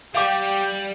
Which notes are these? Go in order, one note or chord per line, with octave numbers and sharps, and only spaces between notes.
G3 G4 F5 D6